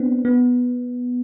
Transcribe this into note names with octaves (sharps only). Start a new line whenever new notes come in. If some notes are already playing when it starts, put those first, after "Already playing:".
Already playing: B3 C4 D4
B3